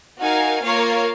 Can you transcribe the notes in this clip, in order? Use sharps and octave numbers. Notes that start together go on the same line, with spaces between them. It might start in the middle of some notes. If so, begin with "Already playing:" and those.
D#4 F#4 A#4 F5 G#5
A#3 F4 A#4 C#5 F5